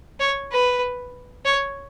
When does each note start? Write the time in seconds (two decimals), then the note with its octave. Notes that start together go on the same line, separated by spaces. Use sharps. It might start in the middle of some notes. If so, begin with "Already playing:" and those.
0.20 C#5
0.52 B4
1.45 C#5